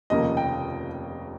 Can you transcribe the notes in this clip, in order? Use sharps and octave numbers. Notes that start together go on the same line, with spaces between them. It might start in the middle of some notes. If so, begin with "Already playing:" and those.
F1 D#2 C#3 F3 A#3 D#5
G5